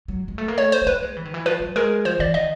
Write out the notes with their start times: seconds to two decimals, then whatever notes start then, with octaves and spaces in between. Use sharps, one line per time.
0.08 F#3
0.28 G#3
0.38 A3
0.48 A#3
0.57 A3 C#5
0.72 C5
0.82 A3
0.87 A#3 B4
1.02 G#3
1.17 E3
1.25 D#3
1.34 E3
1.46 F3 B4
1.60 F#3
1.76 G#3 A#4
2.05 F3 C5
2.19 E3 D5
2.34 D#3 D#5